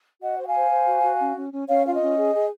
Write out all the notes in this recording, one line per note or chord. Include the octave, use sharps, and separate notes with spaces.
F#4 D#5 F#5
C5 F#5
F5 G#5
C5
C5
F#4
F#4
C#4
C#4
C#4
C#4 C#5 F5
F4 F5
D#5
C#4
G#4
G#4